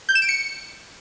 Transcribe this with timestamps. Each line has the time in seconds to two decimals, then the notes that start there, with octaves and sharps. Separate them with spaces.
0.09 G6
0.15 E7
0.22 D7
0.29 C#7